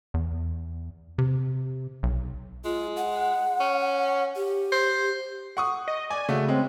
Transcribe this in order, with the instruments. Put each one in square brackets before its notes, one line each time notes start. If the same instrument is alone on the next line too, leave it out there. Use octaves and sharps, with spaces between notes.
[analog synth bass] E2
C3
B1
[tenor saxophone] G#3 [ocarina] F4
[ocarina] F#5
[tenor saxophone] C#4
[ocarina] G4
[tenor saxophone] C5
[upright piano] F#5 C#6 D#6
[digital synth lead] D#5
[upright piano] D5 [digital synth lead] G#5
[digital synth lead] C#3 [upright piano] A3 F#4
[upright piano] G#3 [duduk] C4